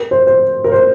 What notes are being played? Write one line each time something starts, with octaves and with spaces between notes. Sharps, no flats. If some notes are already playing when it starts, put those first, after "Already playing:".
Already playing: A#4
C5
C5
A#4
C5